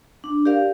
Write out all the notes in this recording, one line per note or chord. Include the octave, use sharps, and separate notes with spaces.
D4
G4 A#4 D5 F5